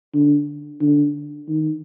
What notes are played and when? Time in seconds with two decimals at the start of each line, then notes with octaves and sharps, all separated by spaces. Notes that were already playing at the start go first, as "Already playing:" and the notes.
0.14 D3
0.81 D3
1.48 D#3